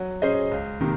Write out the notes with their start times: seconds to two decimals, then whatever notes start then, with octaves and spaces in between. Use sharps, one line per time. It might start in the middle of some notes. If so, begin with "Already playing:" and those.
Already playing: F#3
0.22 C#4 G#4 C5 D#5
0.51 C#2
0.81 C3 D#3 A#3